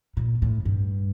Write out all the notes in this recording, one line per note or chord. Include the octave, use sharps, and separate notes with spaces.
A#2
A2
G2